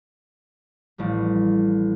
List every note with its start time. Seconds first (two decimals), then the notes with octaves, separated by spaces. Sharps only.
0.98 A1 F3 G3